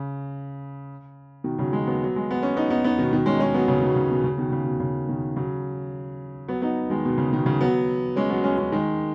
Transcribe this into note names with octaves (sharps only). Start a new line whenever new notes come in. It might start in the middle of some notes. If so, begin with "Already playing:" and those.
Already playing: C#3
B2 D#3
C#3 F#3
D#3 G#3
F#3 B3
F#3
G#3
B3
C#4
B3 D#4
B3 D#4
B3 D#4
B2 D#3
B2 D#3
G#3 C#4
D#4
G#3 C#4
F#3 B3
C#3 F#3
B2 D#3
C#3
B2
C#3
B2 D#3
C#3
B2
C#3
B2 D#3
C#3 F#3
F#3 B3
B3 D#4
D#3 G#3
B2
C#3
B2 D#3
C#3 F#3
F#3 B3
G#3 C#4
F#3 B3
G#3 C#4
G#3 C#4
D#3 G#3